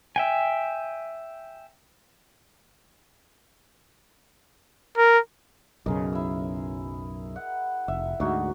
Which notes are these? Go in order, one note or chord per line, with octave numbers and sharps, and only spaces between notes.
E5 G5 G#5
A#4
B1 F#2 C#3 G#3 A#4 D#5
E4 E6
F#5
F1 E5
D2 G#2 D#4 F#4